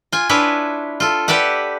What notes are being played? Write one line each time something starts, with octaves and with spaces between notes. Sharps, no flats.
F4 G#5
D4 E4 F4 B4 C#5 E5
F4 A4
G4 B4 D5 E5 F#5